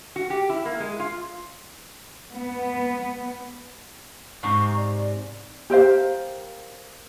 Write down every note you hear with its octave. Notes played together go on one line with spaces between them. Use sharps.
F#4
G4
E4
A#3
G#3
F4
B3
G#2 C3 A#5 C#6
D5
G4 A#4 C5 F5